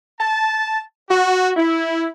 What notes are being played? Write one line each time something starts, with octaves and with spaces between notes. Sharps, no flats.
A5
F#4
E4